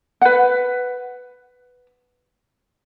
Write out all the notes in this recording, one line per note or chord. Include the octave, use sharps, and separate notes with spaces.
B4 F#5